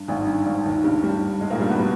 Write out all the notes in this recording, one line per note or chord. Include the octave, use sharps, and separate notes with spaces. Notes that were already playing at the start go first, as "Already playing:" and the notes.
Already playing: G2
G#1 G#2
G2
G#1 G#2
D#2 D#3
G2 G3
G2 G3
G#2 G#3
A#2 A#3
G2 G3
B2 B3
G3